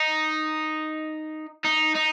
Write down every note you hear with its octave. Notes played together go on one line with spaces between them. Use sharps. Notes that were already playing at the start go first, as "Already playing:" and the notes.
Already playing: D#4
D#4
D#4